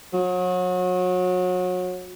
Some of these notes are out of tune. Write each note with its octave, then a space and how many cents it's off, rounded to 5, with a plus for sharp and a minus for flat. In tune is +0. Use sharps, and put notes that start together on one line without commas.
F#3 -30